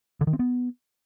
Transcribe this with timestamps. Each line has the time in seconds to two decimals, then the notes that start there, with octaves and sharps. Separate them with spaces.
0.21 D3
0.27 D#3
0.33 C4
0.39 B3